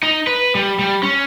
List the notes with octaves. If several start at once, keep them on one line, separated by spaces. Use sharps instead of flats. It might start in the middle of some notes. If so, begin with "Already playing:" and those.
D#4
B4
G3
G3
C#4